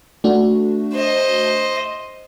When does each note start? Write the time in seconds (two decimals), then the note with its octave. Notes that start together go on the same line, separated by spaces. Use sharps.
0.24 A3 D4 F#4
0.93 C5 D#5